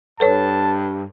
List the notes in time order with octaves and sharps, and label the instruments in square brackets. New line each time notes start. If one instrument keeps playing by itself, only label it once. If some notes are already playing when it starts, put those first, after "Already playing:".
[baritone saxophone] G2 [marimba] A4 B4 C#5 [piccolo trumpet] A5